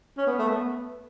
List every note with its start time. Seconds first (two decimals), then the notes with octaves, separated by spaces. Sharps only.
0.18 C#4
0.27 B3
0.39 A3
0.49 B3